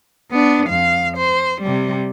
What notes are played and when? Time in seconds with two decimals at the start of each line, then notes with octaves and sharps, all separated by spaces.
0.31 B3 D4
0.67 F2 F5
1.17 C5
1.62 C3 G3